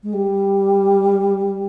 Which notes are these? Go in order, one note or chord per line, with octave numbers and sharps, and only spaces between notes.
G#3
G3